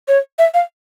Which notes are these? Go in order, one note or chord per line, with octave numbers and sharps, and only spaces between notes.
C#5
E5
F5